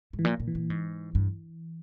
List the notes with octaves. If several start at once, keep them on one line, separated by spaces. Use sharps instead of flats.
G#2
E3
A#2 F3
A#2
E3
A#2
G#2
G2